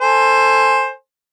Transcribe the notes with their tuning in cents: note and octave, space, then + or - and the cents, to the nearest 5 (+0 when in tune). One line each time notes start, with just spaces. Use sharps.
A4 +15 C5 +10 G#5 +0